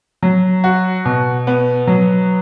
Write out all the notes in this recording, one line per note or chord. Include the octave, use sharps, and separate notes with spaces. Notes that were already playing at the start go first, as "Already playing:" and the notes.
F#3
F#4
B2
B3
F#3